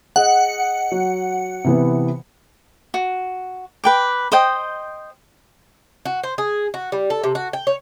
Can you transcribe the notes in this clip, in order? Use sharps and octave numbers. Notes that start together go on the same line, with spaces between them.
G#4 D#5 F#5
F#3
C3 E3 B3
F#4
B4 G5 D6
C5 D#5 G5
F#4
C5
G#4
F#4
G3
A4
C3
F#4
G5
C#5